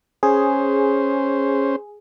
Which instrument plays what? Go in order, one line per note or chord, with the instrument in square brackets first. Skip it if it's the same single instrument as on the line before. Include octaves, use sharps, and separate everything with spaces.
[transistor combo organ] C#4 C5 [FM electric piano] G#4